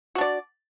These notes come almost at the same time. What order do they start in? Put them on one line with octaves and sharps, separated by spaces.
F#4 D4 D5